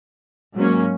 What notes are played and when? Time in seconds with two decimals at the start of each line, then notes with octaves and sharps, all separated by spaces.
0.55 G#2 F#3 A#3 C#4